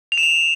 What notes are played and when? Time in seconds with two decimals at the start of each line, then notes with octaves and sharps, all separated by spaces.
0.12 F7
0.17 E7
0.23 F7